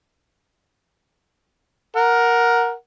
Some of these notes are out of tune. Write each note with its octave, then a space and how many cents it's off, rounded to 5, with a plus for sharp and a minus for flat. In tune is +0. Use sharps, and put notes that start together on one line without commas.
A#4 +5 F#5 -5